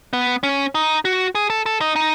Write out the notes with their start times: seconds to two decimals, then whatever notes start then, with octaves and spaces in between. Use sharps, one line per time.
0.13 B3
0.43 C#4
0.75 D#4
1.05 F#4
1.35 G#4
1.50 A4
1.66 A4
1.81 D#4
1.96 D#4